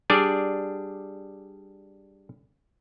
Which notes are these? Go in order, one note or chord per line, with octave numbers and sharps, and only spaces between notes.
G3 D4 G#4 D5